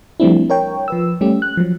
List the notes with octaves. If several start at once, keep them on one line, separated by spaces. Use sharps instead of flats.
F3 G3 A3 C4 D4 E4
A#4 C#5 G5
F3 B4 E6
G3 A3 C#4 G4
F#6
F3 F#3